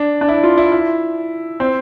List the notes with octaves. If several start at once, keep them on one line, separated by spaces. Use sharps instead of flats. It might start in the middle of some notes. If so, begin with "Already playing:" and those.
Already playing: D4
D4
E4
F4
E4
E4
C4